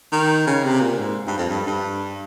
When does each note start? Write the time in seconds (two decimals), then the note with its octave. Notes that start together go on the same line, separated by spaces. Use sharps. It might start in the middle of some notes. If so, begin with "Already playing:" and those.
0.12 D#3
0.47 C#3
0.64 C3
0.81 A#2
0.98 G#2
1.27 G2
1.38 F2
1.49 G2
1.67 G2